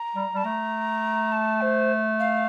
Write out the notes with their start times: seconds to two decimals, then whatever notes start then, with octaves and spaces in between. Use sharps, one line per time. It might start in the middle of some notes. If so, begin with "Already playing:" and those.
Already playing: A#5
0.15 G3
0.34 G3 A5
0.44 A3 A#5
1.32 A5
1.61 C5
2.20 F5